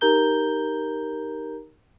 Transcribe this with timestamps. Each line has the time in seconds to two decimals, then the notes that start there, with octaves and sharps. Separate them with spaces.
0.01 D#4 G4 A#4 A#5 G6 G7